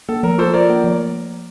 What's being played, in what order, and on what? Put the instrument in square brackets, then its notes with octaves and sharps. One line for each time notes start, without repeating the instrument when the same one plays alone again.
[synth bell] A#3 [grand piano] A4
[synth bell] F3 [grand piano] A#4
[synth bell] F4 [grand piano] A4 C5
[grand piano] A#4 D5 [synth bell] C5
[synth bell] A#3
F3